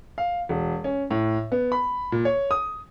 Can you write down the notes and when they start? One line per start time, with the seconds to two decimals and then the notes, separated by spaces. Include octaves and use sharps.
0.18 F5
0.49 E1
0.84 C#4
1.11 A2
1.52 B3
1.72 B5
2.12 A#2
2.25 C#5
2.51 D#6